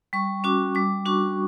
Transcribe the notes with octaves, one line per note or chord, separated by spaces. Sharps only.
G3 C#6
C#4 F#4 D6
G3 D6
D4 F#4 C#6